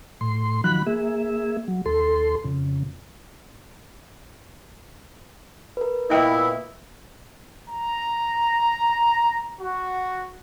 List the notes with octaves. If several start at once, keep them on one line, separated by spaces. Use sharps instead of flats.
A2 C6
D#3 F3 F#3 B5 F#6
A#3 G#4 E5
F#3
D#2 A4 C6
F2 C#3
A#4 B4
A#2 B3 E4 D#5 G5
A#5
F#4